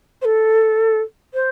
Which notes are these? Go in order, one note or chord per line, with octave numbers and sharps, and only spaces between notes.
C5
A4
C5